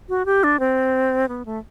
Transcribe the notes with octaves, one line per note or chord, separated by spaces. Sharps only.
F#4
G4
D4
C4
B3
A3